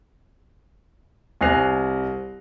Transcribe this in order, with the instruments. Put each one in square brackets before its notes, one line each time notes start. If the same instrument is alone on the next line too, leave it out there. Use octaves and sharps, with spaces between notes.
[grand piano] C2 G#5 F#6 A#6 C7 F7